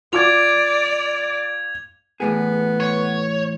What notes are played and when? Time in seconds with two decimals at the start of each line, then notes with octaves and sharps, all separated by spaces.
0.13 F4 D5 D6 G#6 F7
2.20 E2 A2 B3 G#4
2.80 C#5